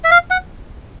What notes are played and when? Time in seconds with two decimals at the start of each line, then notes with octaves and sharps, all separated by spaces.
0.04 E5
0.11 F5
0.31 F#5